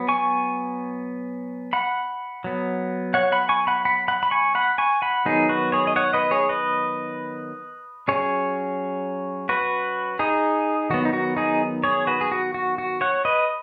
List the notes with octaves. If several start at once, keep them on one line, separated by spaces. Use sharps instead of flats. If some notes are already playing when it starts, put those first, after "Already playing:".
Already playing: F#3 B3
G#5 C#6
F#5 B5
F#3 B3
C#5 F#5
F#5 B5
G#5 C#6
F#5 B5
F#5 B5
F#5 B5
B5
G#5 C#6
F#5 B5
G#5 C#6
F#5 B5
D#3 F#3 B3 D#4 G#4
F#4 B4
G#4 C#5
D#5
C#5 F#5
B4 D#5
G#4 C#5
B4 D#5
F#3 C#4 G#4 C#5
F#4 B4
D#4 G#4
D#3 F#3 B3 F#4
D#4
F#4
D#4 G#4
G#4 C#5
F#4 B4
G#4
F#4
F#4
F#4
C#5 F#5
B4 D#5